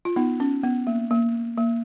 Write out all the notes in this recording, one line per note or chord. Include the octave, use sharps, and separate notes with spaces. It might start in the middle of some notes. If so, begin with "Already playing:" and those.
F4
B3 D#4
C#4
B3
A#3
A#3
A#3